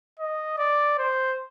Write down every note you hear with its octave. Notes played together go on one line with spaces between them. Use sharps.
D#5
D5
C5